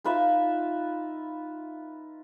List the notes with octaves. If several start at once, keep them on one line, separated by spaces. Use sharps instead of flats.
D#4 F4 B4 E5